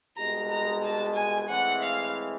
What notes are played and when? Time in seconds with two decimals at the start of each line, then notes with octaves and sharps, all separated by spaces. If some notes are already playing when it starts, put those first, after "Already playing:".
0.17 C2 B2 G#3 A#5
0.50 A#5
0.83 A5
1.15 G#5
1.49 A2 E3 G#3 C4 F#5
1.82 F5